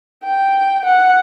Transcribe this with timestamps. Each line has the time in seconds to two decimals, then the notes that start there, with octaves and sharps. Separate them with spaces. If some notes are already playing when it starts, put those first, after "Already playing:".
0.23 G5
0.85 F#5